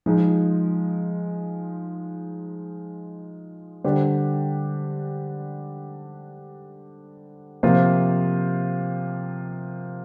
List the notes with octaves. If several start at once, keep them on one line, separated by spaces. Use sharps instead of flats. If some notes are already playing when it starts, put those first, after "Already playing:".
F3 G#3 D#4
D3 G3 D4 G4 C5
C3 F3 A#3 F4 C5